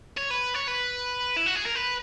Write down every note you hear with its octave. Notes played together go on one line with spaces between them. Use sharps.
C#5
B4
C#5
B4
E4
F#4
G#4
A#4
B4